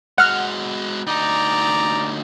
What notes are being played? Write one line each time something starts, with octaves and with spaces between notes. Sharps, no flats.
G#3 F#4 F#5 F6
D2 D#4 D5 A#5